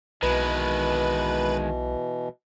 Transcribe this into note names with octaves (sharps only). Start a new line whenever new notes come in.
B1 B2 D#3 E3 G#3 B4